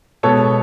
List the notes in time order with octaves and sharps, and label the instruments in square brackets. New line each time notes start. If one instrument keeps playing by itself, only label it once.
[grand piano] B2 G#3 B3 A4 C#5